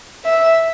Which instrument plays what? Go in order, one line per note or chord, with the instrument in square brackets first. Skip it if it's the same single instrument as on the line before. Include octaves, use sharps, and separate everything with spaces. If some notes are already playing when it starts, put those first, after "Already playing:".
[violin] E5